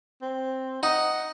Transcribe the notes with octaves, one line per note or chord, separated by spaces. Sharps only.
C4
D#4 F#5